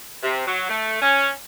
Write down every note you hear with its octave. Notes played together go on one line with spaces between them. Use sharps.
C3
F#3
A3
C#4